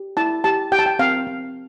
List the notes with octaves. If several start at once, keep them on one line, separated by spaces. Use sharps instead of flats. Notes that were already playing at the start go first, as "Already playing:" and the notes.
Already playing: G4
E4 A5
G4 A5
G4 G5
A5
G5
C4 F5
C4